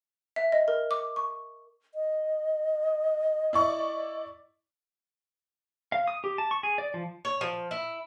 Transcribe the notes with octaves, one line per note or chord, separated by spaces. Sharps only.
E5
D#5
A#4
D6
C#6
D#5
E4 D5 C#6
F5
D#6
G4
A5
C#6
G#4
D5
F3
C#5
F3
E4